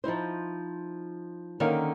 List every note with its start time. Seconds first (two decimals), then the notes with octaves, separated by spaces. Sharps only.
0.04 F3 D#4 E4 C5
1.60 D3 D#3 A#3 C#4 F5